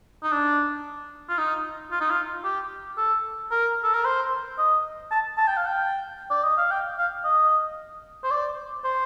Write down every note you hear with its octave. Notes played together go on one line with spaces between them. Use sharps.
D#4
D4
F4
D#4
F4
D#4
F4
G4
A4
A#4
A4
A#4
C5
D#5
A5
A5
G5
F5
G5
D5
D#5
F5
G5
F5
D#5
C5
D5
C5